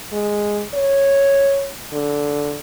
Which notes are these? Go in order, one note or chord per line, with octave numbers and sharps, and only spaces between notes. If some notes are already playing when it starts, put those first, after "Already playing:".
G#3
C#5
D3